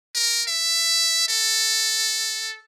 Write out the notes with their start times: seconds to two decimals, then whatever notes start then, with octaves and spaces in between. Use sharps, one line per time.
0.15 A#4
0.48 E5
1.28 A4